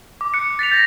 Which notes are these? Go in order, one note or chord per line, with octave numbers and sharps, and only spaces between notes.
D6
F#6 C#7
A6 B6 C#7 F7
G6 A#6 C#7